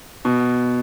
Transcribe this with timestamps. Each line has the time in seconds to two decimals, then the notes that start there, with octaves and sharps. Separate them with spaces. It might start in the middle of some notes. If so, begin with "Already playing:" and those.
0.25 B2